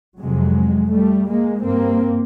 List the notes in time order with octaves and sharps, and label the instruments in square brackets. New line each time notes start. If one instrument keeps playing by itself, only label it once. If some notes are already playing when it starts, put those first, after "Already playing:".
[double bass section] F2 C3 F#3 G#3
G3 A3
G#3 A#3
G2 A#3 C4